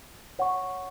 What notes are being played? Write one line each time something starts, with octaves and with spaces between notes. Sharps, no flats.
C#5 F#5 C#6